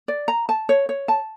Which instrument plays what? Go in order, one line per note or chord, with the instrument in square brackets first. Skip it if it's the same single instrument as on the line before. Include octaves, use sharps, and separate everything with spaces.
[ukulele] D5
A#5
A5
C#5
C#5
A5